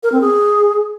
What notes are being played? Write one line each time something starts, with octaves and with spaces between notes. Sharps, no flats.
A#4
C4
G#4